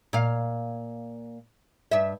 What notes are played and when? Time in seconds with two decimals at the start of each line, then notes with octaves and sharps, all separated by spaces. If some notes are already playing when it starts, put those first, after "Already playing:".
0.13 A#2 F5
1.91 G2 E5